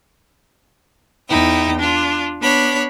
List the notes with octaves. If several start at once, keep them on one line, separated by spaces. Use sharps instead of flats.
E2 D#4 E4 G5
D4 F4
B3 D4 C#5 B5